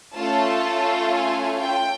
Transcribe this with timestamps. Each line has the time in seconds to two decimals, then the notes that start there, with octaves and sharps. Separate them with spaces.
0.14 A3 C#4 F4 A4 A5
1.11 G#5
1.61 G5